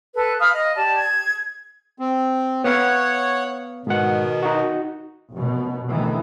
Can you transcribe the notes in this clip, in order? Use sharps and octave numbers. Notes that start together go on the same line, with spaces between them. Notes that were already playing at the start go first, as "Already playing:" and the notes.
A4 B4
F5 B5 D#6 F6
D#5
G4 D5 A5
G#6
C4
B3 C#5 F5 F#5
G#2 B2 D#3 F#5
D#4 F#4
F1 F#2 B2
A1 D2 A2 D#3 E3